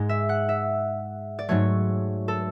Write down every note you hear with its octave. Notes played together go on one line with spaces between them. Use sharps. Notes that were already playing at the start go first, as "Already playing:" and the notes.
Already playing: G#2 G#3
E5
F#5
E5
D5
G#2 F#3 A3 C#5
A4